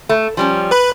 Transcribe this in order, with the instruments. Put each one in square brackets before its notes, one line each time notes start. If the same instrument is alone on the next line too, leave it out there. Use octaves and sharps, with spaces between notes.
[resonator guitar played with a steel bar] A3
F3 G3 C#4
[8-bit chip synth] B4 B5